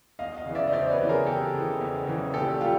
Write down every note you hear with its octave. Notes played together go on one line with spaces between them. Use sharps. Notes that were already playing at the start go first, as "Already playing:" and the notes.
E2 D#5 F5
D#5 F5
C#3 E3
D5 E5
D#5
E2 C5 D5
B4 C#5
C#3 E3
G#4 A#4
E2 G4 A4
C#3 E3
E2
C#3 E3
A#1 G4 A4
G3 F4 G4